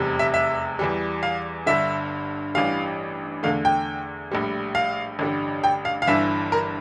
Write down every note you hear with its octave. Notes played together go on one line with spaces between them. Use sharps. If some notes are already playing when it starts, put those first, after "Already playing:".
Already playing: F1 E2 C3 G3
E5
E5
E2 E3 G3
F5
G1 G2 D3 E5
A1 G2 E3 G3 F5
E2 D3 A3 F5
G5
A#1 A2 G3
F5
A1 G2 D3 G3
G5
F5
F5
G1 G2 E3 E5
A#4